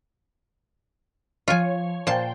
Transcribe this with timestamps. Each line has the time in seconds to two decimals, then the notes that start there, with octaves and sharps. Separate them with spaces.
1.48 F3 F4 C#5 G#5
2.07 A#2 C5 G5 A5